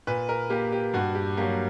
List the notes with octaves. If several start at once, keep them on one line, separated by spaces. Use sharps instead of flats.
A#2 B4
A#4
A#3 G4
G4
G2 F#4
G4
F#3 A#3 G4